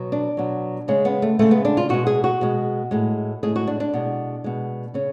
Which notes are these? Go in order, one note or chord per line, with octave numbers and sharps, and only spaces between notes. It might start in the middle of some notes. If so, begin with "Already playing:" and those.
Already playing: B2 F#3
D4
B2 F#3
C#3 G#3 C#4
B3
A3
C#3 G#3 A3
B3
D4
F4
B2 G#3 F#4
G#4
F#4
B2 G#3
A2 G#3
A2 G#3 G#4
F#4
D4
D4
B2 G#3
B2 G#3
C#3 C#4